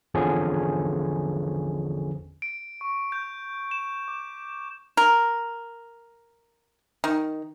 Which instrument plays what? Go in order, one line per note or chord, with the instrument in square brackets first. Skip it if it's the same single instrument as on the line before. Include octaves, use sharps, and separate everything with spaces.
[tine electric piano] G#1 E2 D3 F3 C#4 G#4
[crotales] D7
C#6
G6
E7
D6
[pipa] A#4
D#3